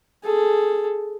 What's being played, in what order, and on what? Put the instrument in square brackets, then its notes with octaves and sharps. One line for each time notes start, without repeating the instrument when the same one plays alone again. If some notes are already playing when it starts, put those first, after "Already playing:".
[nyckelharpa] G#4 A4